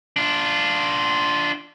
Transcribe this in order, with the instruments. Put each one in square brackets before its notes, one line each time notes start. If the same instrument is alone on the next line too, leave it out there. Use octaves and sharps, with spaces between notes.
[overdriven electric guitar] D4 F4